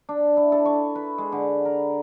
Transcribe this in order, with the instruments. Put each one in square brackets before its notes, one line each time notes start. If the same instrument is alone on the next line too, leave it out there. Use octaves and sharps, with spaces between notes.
[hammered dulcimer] D4
E4
A4
C#6
B4
G#3
D3
A#4